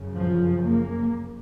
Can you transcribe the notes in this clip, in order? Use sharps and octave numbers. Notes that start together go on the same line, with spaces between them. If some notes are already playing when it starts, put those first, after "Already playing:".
Already playing: F#2 C#3
F3
A#3